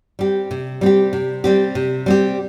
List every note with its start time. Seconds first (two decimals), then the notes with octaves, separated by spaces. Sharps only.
0.19 G3 C4 G4
0.51 C3
0.81 G3 C4 G4
1.13 C3
1.44 G3 C4 G4
1.75 C3
2.06 G3 C4 G4